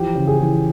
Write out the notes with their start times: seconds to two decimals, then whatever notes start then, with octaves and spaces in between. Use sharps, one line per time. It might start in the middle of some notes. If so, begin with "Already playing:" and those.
Already playing: E3 F3 G4
0.15 C#3
0.27 G#4
0.40 E3